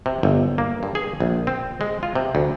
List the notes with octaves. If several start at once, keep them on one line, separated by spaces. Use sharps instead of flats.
C3
G1
A#3
G2
G#4
A#1
C4
G#3
F4
C3
D2